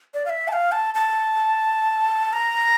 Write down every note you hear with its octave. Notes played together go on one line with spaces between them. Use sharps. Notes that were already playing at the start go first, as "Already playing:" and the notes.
D5
F5
E5
A5
F5
A5
A5
A#5